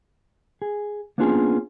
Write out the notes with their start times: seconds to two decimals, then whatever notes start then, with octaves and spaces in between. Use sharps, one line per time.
0.62 G#4
1.18 A#3 B3 C#4 D4 F4 G#4